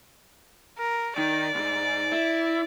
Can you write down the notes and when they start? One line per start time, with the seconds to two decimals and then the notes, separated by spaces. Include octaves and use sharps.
0.78 A#4
1.18 D#3 D5
1.55 C2 G#2
2.12 E4